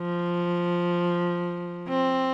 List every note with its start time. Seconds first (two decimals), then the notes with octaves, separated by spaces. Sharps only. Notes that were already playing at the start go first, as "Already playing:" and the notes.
Already playing: F3
1.89 C4